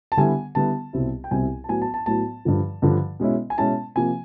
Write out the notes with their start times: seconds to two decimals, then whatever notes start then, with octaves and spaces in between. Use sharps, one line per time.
0.12 A5
0.17 D3 G3 B3 E4 G#5
0.55 D3 G3 B3 E4 A5
0.93 C2 B2 G3 C4 E4
1.24 G5
1.31 C2 B2 G3 C4 E4 G#5
1.64 A5
1.69 A2 F#3 B3 G#5
1.82 A5
1.94 A5
2.06 A2 F#3 B3 A5
2.45 G2 D3 F3
2.82 G2 D3 F3
3.20 B2 G#3 C#4 E4
3.50 G#5
3.58 B2 G#3 C#4 E4 A5
3.95 C3 F3 A#3 G#5